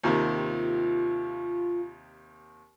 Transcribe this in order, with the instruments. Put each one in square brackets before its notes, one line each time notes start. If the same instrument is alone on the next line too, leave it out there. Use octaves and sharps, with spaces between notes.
[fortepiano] D#2 C3 D#3 [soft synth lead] F4